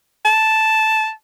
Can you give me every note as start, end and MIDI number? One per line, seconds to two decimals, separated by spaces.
0.25 1.11 81